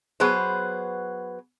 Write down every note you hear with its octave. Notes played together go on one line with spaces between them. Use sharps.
F#3 B3 G#4 B4 C5